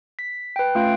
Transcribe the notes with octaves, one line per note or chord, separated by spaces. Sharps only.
B6
B4 G5
A3 C#4 F4 F5 D7